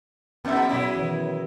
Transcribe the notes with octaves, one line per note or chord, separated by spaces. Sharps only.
F2 G#2 B3 E5
B2 F#3 G#3 C#4 E4
D#3 E3